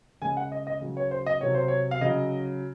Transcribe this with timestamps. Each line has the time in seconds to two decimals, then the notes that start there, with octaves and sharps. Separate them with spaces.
0.22 C#3 G#3 G#5
0.37 F#5
0.52 D#5
0.67 D#5
0.81 C#3 F#3
0.97 C#5
1.11 C5
1.26 D#5
1.41 C3 F#3 C#5
1.55 C5
1.68 C#5
1.91 F5
2.01 C#3 F#3 D#5